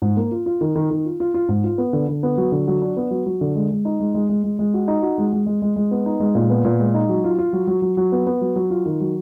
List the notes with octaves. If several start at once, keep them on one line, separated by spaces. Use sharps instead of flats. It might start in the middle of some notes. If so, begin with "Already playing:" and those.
G#2
A#3
F4
F4
D#3
D#3
D#3
F4
F4
F4
G#2
F4
B3
D3
D3
B3
F#3
D3
F#3
D4
B3
F#3
F#3
D3
G#3
G#3
D#4
G#3
G#3
G#3
G#3
G#3
F#4
D#4
F#4
G#3
G#3
G#3
G#3
G#3
B3
D#4
G#3
A#2
B3
A#2
G#3
D#4
F#3
F4
F4
F#3
F#3
F#3
F#3
B3
B3
F#3
F#3
F4
D#3
F#3